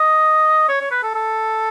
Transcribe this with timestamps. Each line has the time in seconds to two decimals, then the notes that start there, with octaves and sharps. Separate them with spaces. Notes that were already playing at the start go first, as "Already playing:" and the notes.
Already playing: D#5
0.69 C#5
0.81 C#5
0.91 B4
1.03 A4
1.15 A4